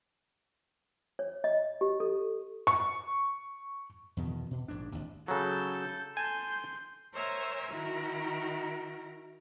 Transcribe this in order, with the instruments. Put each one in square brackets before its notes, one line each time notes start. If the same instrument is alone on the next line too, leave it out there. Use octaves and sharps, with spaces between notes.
[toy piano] C#5
D#5
G4
A4
[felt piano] C#6
[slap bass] E2 B2 D#3
B2
A#1 G#2 D4
G#1 D#2
[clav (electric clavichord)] C#3 F#3 [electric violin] A4 G6
[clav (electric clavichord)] G#5 A5 [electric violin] C6 G6
[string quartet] A#4 C5 C#5 E5 G#5 F6
D#3 E4 F#4 A#4